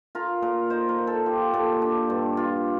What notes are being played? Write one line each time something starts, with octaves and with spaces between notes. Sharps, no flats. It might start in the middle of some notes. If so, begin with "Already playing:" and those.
F4 A#4
A#2 A#4
D#4 C5
A#4
A#2
A4
F4 G4
A#2 A4
D4
G2
F4